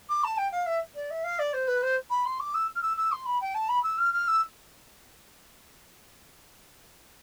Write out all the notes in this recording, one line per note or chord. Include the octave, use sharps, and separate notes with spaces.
D6
A5
G5
F5
E5
D5
E5
F5
D5
C5
B4
C5
B5
C6
D6
E6
F6
E6
E6
C6
B5
G5
A5
B5
E6
F6
F6
E6